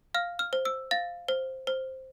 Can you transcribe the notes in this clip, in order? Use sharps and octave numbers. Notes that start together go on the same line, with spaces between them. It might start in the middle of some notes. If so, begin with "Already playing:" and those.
F5 F6
F6
C5
E6
F5 A6
C5
C5